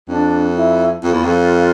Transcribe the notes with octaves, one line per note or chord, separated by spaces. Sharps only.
F2 D4
E4
F2 F4
E2
F2